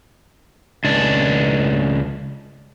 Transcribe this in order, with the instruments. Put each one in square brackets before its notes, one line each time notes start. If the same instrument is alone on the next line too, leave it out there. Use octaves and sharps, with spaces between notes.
[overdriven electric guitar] C#2 D4